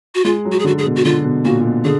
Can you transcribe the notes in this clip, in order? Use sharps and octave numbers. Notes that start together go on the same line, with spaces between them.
F#4
G#3 F4
F#3
F#4
G#4
D3 F#4
G#4
B2
F#4
D3 F4
B2
A#2 F#4
A#2
B2
D3 G#4